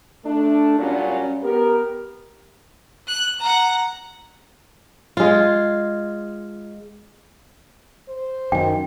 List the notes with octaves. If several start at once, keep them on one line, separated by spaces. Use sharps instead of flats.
A3 D4
A#2 F#3 G3 C#4
B3 G4 A#4
F#6
F#5 A#5
G#3 F4
C5
F#2 D#3 G5